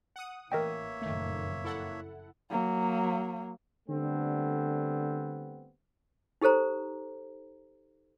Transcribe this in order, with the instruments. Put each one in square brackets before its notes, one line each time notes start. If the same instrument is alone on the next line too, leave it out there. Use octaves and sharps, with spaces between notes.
[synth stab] F#5 D#6
[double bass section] A1 E3 [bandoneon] A#3 C#5 E5 [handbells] A#4 D#5 G5
[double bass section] F#1 F2 A#2 [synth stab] D#3 A3
[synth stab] E4 A4 F#5
[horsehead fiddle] F#3 A#3
[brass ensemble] D3 G3 A3 B3 C4
[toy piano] D#4 G4 A4 C5 A#5